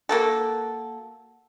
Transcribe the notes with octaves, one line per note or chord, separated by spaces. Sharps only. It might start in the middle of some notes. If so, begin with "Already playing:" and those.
A#3 F#4 A4